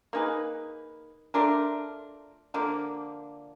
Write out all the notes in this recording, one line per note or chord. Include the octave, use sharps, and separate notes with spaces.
A#3 D#4 G#4 B4
A3 D4 F4 A#4
D3 F3 A#3